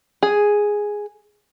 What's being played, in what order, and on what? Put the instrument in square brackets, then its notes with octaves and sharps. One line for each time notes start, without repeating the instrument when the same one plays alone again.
[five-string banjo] G#4